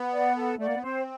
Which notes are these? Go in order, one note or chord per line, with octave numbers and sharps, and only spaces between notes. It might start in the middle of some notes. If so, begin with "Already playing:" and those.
Already playing: B3
D5 F#5
A4
A3 D5 F#5
A#3
B3
C4 C5